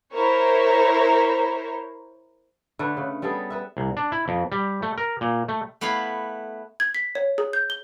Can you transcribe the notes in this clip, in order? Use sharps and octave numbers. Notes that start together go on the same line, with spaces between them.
E4 A#4 C5 C#5
D3 A3 B4 E5
C#3
G3 B3 G#4 A4
B3 B4 E5
C2
D4
E4
F2
G3
A3
A#4
A#2
A3
A3 B3 E4 F5 B5
G#6
B6
C#5
G#4
G6
G7